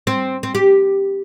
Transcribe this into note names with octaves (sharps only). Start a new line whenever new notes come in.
C4
C4
G4